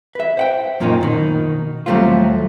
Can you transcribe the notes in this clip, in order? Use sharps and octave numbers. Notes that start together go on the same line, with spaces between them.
B4 E5
C5 F#5 G5
F#2 A#2 F3 A#3 C#4 D#4
B2 D#3
D#2 F#3 G3 A3 C4 F4